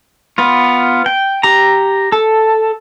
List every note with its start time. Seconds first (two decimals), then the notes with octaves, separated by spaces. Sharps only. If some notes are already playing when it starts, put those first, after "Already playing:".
0.38 B3 F4
1.06 G5
1.43 G4 A#5
2.12 A4